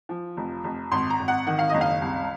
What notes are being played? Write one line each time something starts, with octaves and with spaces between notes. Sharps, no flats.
F3
F1
F1
G#1 C6
A#5
G#1
F#5
D#3 F#5
F5
F#1 D#5
F5
C2